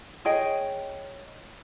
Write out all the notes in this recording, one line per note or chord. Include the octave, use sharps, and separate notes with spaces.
G#4 C#5 D#5 G5